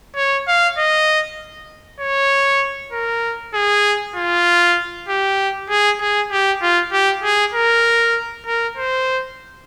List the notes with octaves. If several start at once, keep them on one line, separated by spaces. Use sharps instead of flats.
C#5
F5
D#5
C#5
A#4
G#4
F4
G4
G#4
G#4
G4
F4
G4
G#4
A#4
A#4
C5